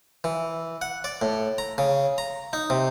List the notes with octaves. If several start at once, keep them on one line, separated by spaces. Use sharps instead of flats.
E3
F#5
D5
A2
A#5
C#3
A#5
D#4
C3